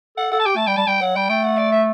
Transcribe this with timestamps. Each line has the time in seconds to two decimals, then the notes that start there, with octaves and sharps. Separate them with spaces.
0.17 A4 F#5
0.31 A4 F#5
0.40 A5
0.46 G4 G5
0.56 A3 A5
0.67 G3 G5
0.77 G3 A5
0.87 G3 G5
1.01 F#3 F#5
1.16 G3 G5
1.29 A3 G5
1.43 F#5
1.57 D5
1.72 E5